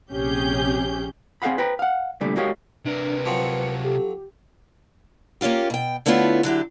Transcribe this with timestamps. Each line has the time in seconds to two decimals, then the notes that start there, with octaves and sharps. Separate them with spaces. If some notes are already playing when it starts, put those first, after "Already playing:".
0.12 A#1 C3 C#4 G4 G#4 G6
1.42 C4 G#4 B4 F5 F#5 B5
1.58 B4 C5 G5 A#5 B5
1.79 F5 F#5
2.21 C2 A#2 D3 G3 A3
2.37 G#3 F#4 G4 A#4 C#5 F5
2.85 C3 D4 A#4 B4
3.26 F3 F#3 C4 C#7
3.84 G4 A4
5.41 A#3 C#4 D4 F4 G4
5.70 B2 G5
6.06 D3 A3 B3 E4 F4 C#5
6.43 D3 F#3 E4 G4